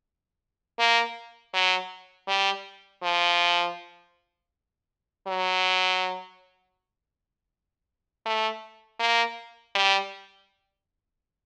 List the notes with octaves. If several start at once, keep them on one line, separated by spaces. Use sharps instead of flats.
A#3
F#3
G3
F3
F#3
A3
A#3
G3